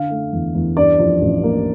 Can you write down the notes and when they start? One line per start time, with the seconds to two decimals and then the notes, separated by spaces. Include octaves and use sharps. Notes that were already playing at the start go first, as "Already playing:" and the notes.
Already playing: D3 F5
0.10 A3
0.33 E2
0.55 E2
0.77 G2 D5
0.99 F3
1.22 A1
1.43 A#3